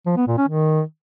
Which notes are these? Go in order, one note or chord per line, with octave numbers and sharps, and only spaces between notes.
F3
B3
A#2
C#4
D#3